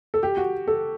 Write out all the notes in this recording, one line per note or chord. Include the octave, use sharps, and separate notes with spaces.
A4
G4
F#4
A4